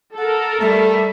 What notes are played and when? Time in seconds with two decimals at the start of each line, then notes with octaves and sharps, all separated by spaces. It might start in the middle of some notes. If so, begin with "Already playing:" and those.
0.18 A4 A#4 F#5
0.61 G3 A3 E5